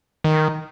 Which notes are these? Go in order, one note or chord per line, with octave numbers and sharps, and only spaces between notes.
D#3